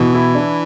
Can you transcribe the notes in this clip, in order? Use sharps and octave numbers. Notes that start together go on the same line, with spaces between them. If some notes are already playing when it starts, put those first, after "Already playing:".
Already playing: B2 E3
E4
D4